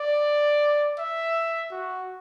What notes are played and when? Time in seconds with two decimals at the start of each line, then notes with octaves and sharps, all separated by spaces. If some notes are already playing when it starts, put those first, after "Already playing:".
Already playing: D5
0.99 E5
1.71 F#4